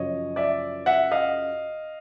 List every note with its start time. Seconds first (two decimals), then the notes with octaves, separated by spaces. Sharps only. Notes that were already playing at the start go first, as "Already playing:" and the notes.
Already playing: F#2 C#3 F3 C#5 D#5
0.36 D5 E5
0.86 E5 F#5
1.12 D#5 F5